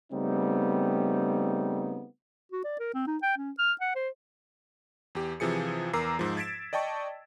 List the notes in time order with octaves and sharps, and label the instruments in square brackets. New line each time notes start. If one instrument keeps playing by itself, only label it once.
[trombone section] C#3 G3 A3 B3 C4 D#4
[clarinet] F#4
D5
A#4
C4
D#4
G5
C#4
F6
F#5
C5
[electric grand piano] E2 G4
C3 E3 F3 G#4 C#7
E2 A#4 A#5 D6 E6 C7
G#2 F3
G#6 A6 B6 D7 E7
D5 D#5 G5 A5 C#6